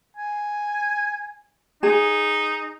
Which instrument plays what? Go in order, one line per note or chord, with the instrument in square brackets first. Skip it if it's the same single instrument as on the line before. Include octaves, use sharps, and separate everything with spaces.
[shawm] G#5
[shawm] D#4 [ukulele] G#4